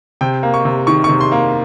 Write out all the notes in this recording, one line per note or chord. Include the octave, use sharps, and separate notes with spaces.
C3 G5
A#3
C#6
C3
D#3 C#6
C#6
C3
C6
A#3